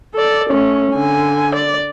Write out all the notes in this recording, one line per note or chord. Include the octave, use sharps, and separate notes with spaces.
A4 D5
A3 C#4
D3 G#5
D5